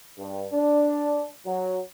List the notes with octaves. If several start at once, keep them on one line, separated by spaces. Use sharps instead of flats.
G2
D4
F#3